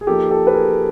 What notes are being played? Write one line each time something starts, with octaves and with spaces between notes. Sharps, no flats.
G#4
F3 A#3 D#4 G4 A4
G4 A4
B4
G#4 A#4